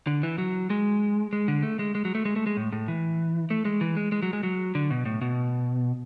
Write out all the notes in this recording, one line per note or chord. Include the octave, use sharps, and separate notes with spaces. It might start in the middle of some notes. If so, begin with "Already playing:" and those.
D3
E3
F#3
G#3
G#3
D3
A3
G#3
G#3
F#3
A3
G#3
A3
G#3
A2
A2
E3
A3
G#3
E3
G#3
G#3
F#3
G#3
F#3
D3
B2
A2
B2